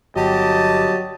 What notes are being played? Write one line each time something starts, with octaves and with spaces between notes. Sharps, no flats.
G1 F#3 G4 D#5 A5